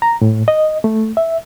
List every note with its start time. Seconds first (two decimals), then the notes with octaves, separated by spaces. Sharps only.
0.02 A#5
0.21 A2
0.48 D#5
0.84 A3
1.17 E5